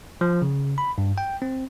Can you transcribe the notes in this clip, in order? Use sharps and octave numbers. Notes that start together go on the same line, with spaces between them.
F3
C#3
B5
G2
G5
C4